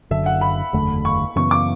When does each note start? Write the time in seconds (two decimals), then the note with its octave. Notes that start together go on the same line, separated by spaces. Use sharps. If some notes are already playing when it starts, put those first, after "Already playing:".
0.10 F#1 F#2 D3 E5
0.26 F#5
0.41 B5
0.73 F#1 E2 D3 A3
1.05 C#6
1.36 F#2 C#3 E3 B3 C#6
1.51 D6